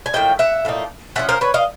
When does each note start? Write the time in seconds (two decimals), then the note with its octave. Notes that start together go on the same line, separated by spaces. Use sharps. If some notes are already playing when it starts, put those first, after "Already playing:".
0.06 G#5
0.13 A2 F3 A#3 D#4 G5
0.39 E5 F#5
0.65 A2 F3 A#3 D#4
1.16 F3 A#3 C#4 E5 F#5
1.29 A#4 C5
1.41 B4 C#5
1.54 D#5 F5